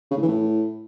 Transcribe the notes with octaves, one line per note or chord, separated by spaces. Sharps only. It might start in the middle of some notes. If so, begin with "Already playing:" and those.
C#3
A2
E3
A2